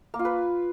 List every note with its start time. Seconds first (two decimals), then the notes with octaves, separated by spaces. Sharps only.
0.14 A#3
0.19 F4
0.25 B4